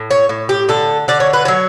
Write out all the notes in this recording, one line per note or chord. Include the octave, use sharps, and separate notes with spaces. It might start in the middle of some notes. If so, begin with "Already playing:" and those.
Already playing: A2
C#5
A2
G4
D3 A4
D3 D5
C#5
B4
F#3 C#5